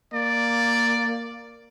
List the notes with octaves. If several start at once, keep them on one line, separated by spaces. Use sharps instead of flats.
A#3 D5